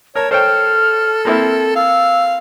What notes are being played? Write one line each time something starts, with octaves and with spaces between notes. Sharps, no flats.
A#4 C#5 A5
A4 C5 C#5 G5 F6
A#3 C4 E4
F5 E6